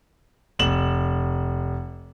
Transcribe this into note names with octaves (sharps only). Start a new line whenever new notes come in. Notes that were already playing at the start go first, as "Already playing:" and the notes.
F1 E7 F#7